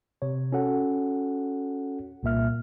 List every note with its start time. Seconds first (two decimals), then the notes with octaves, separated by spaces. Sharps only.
0.22 C3 C#5
0.52 C#4 F#4 A4 F#5
2.23 C2 A#2 A#3 E5 F6